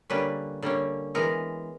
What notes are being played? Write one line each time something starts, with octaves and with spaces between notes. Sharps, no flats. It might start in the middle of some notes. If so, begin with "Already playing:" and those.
D3 G3 A#3 C#4 B4
D3 G3 A#3 C#4
E3 G#3 B3 A#4